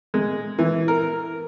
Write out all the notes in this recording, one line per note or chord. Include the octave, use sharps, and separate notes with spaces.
G#3
E3
A#4